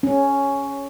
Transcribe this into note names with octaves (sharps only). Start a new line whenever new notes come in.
C#4